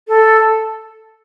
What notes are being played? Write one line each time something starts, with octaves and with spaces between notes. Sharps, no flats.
A4